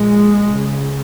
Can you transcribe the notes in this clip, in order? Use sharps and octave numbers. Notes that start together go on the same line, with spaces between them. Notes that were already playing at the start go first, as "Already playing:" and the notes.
Already playing: A#1 A#2 G#3
C#2 C#3